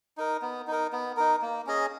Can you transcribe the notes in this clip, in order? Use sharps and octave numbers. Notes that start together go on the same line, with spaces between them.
D#4 A#4
B3
D#4 A#4
B3
D#4 A#4
A#3
C#4 G#4 D#5